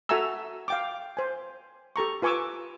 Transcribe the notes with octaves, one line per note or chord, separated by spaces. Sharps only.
F#4 A4 E5 G#5 A#5 E6
F5 G5 D6
C5 G#5
G4 A4 A#5 C#6
F4 B4 G#5 C#6 D6 E6